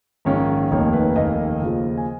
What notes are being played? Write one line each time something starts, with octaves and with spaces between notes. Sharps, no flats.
A#1 G#2 D#3 A#3 C#4
F1 D#2 D#3 A#3 D#4 C#5
B4
F1 D#2 D#3 A#3 D#4 D#5
D#2 C#3 F3
G#5